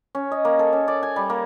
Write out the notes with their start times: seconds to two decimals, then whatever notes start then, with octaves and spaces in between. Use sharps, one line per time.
0.15 C#4
0.32 D#5
0.45 A#3
0.59 A4
0.73 C#4
0.88 D5
1.03 G#5
1.16 G3
1.30 A#3